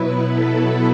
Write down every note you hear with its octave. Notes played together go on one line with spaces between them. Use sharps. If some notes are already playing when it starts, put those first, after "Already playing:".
Already playing: B2 F#3 B3 E4 B4
A4